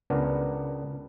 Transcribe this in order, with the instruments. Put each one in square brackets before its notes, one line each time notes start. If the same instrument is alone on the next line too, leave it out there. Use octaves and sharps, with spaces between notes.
[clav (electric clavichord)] C#2 B3 D4 A#4 A#5